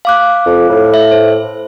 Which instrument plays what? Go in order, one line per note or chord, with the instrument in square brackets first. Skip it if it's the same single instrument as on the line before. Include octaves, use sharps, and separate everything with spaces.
[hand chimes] F5 D6 F#6
[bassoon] F2
A2
[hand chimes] E5
C5